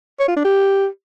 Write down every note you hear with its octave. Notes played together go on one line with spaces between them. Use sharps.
C#5
F4
D4
G4